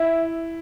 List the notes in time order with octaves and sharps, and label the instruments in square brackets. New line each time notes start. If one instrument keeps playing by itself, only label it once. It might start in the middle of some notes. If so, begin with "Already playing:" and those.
Already playing: [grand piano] E4 [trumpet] E5